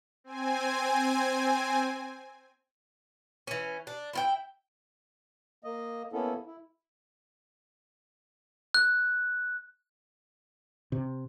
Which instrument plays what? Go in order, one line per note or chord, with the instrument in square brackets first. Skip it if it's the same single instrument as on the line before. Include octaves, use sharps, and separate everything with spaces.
[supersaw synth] C4 G#5
[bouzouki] E3 C#4
D4
E4 F4 G5
[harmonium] A#3 D#5
A#3 B3 C#4 E4 A4
E4
[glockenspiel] F#6
[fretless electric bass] C3